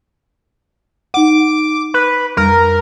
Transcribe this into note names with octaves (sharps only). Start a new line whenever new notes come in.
D#4 F#5 D6
B4
F2 G3 A#4